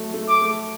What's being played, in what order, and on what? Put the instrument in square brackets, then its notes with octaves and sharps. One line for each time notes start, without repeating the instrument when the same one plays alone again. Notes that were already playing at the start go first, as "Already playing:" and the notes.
Already playing: [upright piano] F#3 A3
A3
[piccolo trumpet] D6
[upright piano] A3